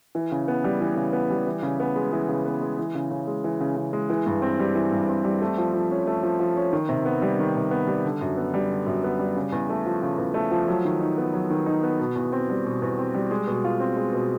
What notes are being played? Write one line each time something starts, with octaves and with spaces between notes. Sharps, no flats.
E3
C#3
B3
G3
E3
C#3
B3
G3
E3
C#3
B3
G#3
E3
C#3
B3
G#3
E3
C#3
C#3
G#3
E3
C#3
C#3
G#3
E3
G2
C4
G3
E3
G2
C4
G3
A3
F3
F3
C#4
A3
F3
F3
C#4
D#3
C3
B3
G3
D#3
C3
B3
G3
D3
F#2
B3
G3
D3
F#2
B3
G3
C#3
E2
A3
F3
C#3
E2
A3
F3
F#3
D#3
D#4
B3
F#3
D#3
D#4
B3
B2
E2
C4
G3
B2
E2
C4
G3
G#3
B2
F4
C4
G#3
B2